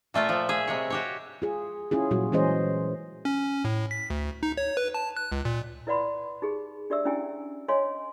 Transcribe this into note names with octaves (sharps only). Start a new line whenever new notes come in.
A#2 A3 F4 E5
F3 E5
G#4 E5
C3 G#3 C#5
F#4 G4 C#5
F4 G#4
C#4 E4 F4 G#4
A#2 F#3 G3 F4 F#4
E3 G#3 C#4 G#4 C5 D#5
C#4
A2
B6
D2
D#4
C#5
B4
A5
F#6
C#2
A#2
E4 B4 D5 F#5 B5 C6
D#4 G4 G#4
D4 G4 D5 E5 E6
C#4 D4 E4 G4 G5 G#5
C#5 D#5 F5 G#5 C6